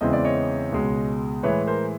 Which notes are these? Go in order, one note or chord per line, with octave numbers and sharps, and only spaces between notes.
E2 C#3 E3 G#3 C4 D#5
D5
C#5 D#5
C#2 B2 G#3
A2 E3 G#3 B4 C#5
A#4 C5